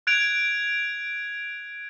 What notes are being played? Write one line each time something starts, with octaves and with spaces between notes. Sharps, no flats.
F#6 G#6 D7 F7